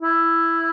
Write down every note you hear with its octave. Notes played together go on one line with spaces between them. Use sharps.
E4